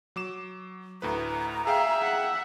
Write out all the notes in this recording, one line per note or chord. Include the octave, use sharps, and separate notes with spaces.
F#3 D6 E7
D2 A2 B4 A#5
G#4 E5 F5 G5
F#5